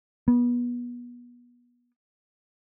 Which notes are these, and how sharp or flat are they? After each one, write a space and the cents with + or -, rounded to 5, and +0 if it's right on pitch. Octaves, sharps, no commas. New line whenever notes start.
B3 -25